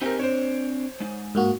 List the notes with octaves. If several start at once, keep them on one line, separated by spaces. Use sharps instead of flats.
C4 D#4 G4 G#4 A#4
C4 D4 C5 C#5
G#3 D#4
G#2 A#3 F#4